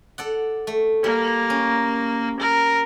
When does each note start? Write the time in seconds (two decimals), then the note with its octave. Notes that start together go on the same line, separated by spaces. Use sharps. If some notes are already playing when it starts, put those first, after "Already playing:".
0.18 A4 D5 F#5
0.67 A3
1.04 G3 A#3
1.50 C#4
2.40 A#4